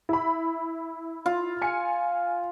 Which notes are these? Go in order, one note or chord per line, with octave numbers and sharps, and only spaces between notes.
E4 B5
F4
G#5 C#7